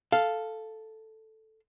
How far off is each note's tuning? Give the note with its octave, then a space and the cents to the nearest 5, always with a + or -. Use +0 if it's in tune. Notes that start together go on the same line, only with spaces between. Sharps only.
A4 +0 F5 +0